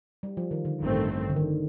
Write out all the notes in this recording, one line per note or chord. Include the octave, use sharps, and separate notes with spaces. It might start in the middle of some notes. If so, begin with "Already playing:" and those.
G3
F3
D#3
D3
A1 G2 D#3 A3 C4
D3
D#3